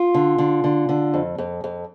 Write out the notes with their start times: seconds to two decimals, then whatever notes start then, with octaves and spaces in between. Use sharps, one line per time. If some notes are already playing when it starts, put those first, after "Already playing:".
Already playing: F4
0.14 D3
0.38 D3
0.64 D3
0.89 D3
1.14 F2
1.38 F2
1.64 F2